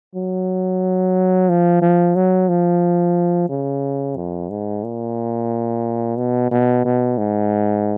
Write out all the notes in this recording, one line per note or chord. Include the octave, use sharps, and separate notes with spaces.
F#3
F3
F3
F#3
F3
C#3
F2
G#2
A#2
B2
B2
B2
G#2